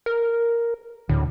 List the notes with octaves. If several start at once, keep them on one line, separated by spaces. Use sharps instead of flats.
A#4
D2 A2